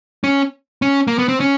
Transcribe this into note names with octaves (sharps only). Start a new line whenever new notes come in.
C#4
C#4
A#3
B3
C4
C#4